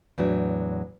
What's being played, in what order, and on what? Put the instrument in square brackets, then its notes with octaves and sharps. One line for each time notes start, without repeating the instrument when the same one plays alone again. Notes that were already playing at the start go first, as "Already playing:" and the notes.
[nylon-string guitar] E2 A2 F#3 D4